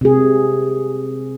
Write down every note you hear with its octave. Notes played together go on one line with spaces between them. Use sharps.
C3 G#4